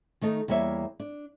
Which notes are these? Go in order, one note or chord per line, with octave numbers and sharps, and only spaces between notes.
D#3 A3 D#4 A4
E2 G3 A#3 C#5 E5
D4